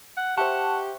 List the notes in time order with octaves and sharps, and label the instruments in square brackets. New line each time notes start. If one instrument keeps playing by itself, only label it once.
[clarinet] F#5
[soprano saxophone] G4 [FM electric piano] C5 E5 C#6 [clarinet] F#5 [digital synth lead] A5